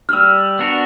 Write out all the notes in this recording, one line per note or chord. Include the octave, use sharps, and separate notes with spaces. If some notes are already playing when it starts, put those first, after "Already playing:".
F6
G3 E6
B3 D4 F#4 A#4